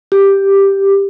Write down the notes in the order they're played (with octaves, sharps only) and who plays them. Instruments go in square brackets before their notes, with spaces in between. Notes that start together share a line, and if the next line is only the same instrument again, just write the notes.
[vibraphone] G4